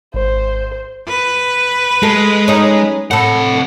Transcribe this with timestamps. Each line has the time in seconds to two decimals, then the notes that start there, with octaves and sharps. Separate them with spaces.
0.14 G#1 C5
1.08 B4
2.03 G#3 A3
2.48 C#4 D#4
3.11 A2 C3 A4 F#5